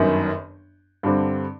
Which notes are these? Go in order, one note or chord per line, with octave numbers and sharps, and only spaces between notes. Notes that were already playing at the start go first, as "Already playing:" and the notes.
Already playing: G1 F#2 D#3
G2 D3 G3 C4